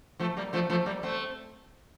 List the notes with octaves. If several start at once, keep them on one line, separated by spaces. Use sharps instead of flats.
F3 A3
G3 A#3
F3 A3
F3 A3
G3 A#3
A3 C4